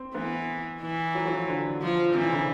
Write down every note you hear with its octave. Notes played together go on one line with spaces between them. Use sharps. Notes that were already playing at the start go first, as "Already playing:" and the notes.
Already playing: C4
E3 B3
E3
F#3
F#3
F3
D3
F3
C3 E3
C#3
D3